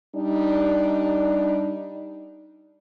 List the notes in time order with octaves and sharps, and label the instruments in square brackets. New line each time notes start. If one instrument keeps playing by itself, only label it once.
[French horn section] G3 D4 D#4